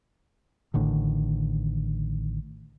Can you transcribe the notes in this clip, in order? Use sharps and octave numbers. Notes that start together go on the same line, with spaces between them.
A1 A2 D3 D#3